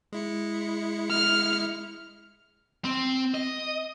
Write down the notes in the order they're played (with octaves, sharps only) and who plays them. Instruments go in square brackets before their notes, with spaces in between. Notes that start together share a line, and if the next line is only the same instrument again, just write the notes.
[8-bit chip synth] G#3 E4 C#7
[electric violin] F6
[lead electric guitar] C4
D#5